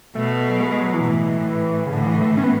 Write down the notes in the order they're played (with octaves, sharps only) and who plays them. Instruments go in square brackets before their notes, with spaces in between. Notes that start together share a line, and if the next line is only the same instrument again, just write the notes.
[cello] B2 [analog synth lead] A3
[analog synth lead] F#3
G#3
G#3
F#3
E3
[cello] A2
[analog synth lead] C#3
[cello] A2 [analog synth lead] D3
[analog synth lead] E3
A3
C#4
B3